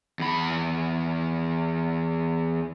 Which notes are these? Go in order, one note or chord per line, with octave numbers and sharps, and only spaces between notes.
E2 B5